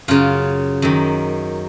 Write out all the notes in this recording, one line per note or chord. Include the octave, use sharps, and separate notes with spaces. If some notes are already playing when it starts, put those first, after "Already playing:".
F#2 C#3 F4
F#2 D#3